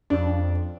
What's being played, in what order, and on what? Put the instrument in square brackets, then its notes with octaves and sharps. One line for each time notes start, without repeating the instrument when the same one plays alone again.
[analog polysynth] F2 [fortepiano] D4